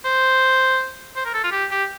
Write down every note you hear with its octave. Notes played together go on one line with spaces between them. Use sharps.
C5
C5
A#4
A4
F4
G4
G4